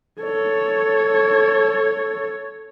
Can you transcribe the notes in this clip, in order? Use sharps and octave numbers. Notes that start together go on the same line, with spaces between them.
A4 C#5